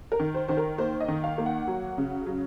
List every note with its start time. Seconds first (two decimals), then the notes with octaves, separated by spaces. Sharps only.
0.12 A#4
0.20 D#3
0.34 C5
0.48 D#3 C5
0.57 A#4
0.78 A#3 C5
1.00 D#5
1.08 D#3
1.24 F5
1.38 A#3
1.46 F#5
1.67 F#3
1.98 C#3
2.26 F#3